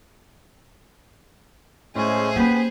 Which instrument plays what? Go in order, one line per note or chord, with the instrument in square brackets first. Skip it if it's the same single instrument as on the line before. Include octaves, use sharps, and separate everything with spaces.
[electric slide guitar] A2 A3 [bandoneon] G#3 C#4 [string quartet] G#4 C5
[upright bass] A#3 C#4 [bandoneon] B3 [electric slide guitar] G4 B4